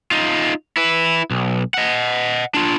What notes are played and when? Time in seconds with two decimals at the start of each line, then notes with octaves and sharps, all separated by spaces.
0.11 D#4 F4
0.77 E4 B4
1.31 B1
1.74 D#5 F#5
2.54 D4 F4